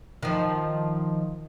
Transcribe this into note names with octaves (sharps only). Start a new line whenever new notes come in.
D#3 F3